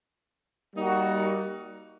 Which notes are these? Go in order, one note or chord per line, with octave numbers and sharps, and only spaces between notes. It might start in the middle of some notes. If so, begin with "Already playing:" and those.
G3 A#3 D#4 F#4 A#4